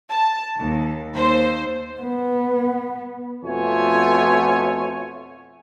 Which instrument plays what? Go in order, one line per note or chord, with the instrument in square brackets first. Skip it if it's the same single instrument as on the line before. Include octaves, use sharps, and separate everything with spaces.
[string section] A5
D#2
D#2 C5
[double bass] B3
[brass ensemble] F2 B2 A3 F4 C#5 G#5